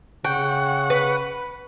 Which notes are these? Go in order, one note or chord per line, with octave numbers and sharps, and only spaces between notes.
C#3 F#5 G5 C#6
B4